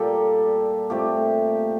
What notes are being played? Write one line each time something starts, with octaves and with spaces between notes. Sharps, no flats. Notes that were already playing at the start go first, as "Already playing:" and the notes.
Already playing: A#2 G3 A#3 G4 A4
A#2 A3 C4 G4